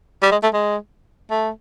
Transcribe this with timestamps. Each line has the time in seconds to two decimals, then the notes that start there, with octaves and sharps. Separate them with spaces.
0.22 G3
0.32 G#3
0.43 A3
0.53 G#3
1.30 A3